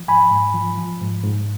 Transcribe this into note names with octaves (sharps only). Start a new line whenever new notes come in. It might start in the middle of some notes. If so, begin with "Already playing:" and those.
Already playing: F3
G#2 G#5 B5
G#2
F3
F3
G#2
G#2